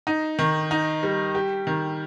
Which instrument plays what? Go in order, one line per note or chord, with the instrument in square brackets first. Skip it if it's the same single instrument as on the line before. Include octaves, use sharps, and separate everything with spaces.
[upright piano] D#4
D#3
D#4
G3
G4
D#3